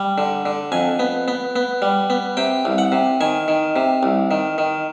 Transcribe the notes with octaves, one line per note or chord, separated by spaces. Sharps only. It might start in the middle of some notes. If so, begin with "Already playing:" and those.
Already playing: G3
D3
D3
F2 G#5
B3
B3
B3
G3
B3
C3 G5
C2
F#5
C3
D#3 G#5
D#3
C3
C2
D#3
D#3